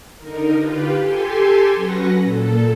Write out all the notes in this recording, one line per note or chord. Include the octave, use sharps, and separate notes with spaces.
D3 D#4 A#4
F4 G4 B4
G4 A4 G#5 C6
F#3 C#4 B4 F#5 A#6
A#2 A4